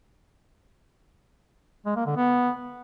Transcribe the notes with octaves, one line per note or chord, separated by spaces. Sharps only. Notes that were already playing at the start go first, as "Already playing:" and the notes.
G#3
A#3
D3
B3